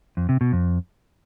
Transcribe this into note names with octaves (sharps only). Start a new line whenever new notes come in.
F2
C3
B2
F2